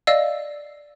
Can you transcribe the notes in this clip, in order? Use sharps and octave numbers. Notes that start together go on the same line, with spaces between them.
D5 D#5 F5 E6